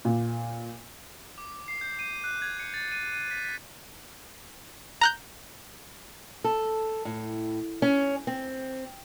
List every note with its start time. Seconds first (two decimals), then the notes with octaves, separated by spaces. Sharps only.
0.05 A#2
1.38 D6
1.68 C7
1.81 G6
1.99 D#7
2.24 F#6
2.42 G#6
2.59 C#7
2.74 A6
2.92 D#7
3.13 D#7
3.31 B6
3.45 B6
5.01 A#5 F#6 G6
6.44 A4
7.05 A2
7.82 C#4
8.27 C4